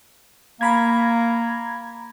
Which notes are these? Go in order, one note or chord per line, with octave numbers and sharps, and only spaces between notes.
A#3 A#5 B5 G#6